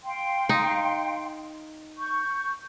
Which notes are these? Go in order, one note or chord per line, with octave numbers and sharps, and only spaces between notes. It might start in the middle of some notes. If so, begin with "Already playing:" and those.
F5 G5 C6
D#4
C#6 G6